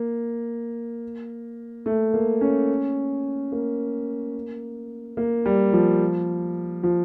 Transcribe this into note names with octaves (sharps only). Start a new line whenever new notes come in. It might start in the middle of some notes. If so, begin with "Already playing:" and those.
Already playing: A#3
A3
A#3
C#4
A#3
A#3
G3
F3
F3